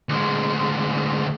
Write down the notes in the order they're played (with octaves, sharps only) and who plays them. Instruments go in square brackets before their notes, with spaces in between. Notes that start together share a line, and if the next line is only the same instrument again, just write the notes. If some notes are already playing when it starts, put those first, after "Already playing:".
[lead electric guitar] D2 G#3